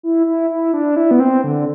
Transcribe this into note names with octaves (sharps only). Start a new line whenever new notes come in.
E4
E4
E4
D4
E4
B3
C4
D3